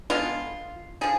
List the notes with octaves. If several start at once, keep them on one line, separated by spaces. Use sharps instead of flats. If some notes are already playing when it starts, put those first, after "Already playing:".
D3 G#3 B3 F4
D3 F3 G#4